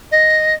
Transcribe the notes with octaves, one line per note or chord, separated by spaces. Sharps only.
D#5